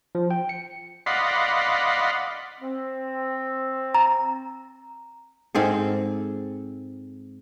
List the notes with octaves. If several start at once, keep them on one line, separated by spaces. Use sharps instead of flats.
F3
G5
C#7
D5 D#5 F5 F#5 B5 C6
C4
A#5
G#2 C4 G#4 A4